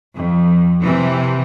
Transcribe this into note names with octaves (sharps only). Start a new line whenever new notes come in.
F2
C3 E3